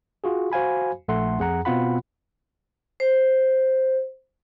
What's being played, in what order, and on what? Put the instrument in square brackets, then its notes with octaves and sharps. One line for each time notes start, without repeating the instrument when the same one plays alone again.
[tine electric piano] F4 F#4 G#4
F#4 C5 F5 G#5 B5
A#1 A3 A4 F#5 C6
F2 G#4 F#5 A#5
B2 B3 C4 F4 F#5 B5
[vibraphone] C5